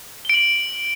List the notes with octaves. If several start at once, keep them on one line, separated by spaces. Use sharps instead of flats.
D7 F#7 G7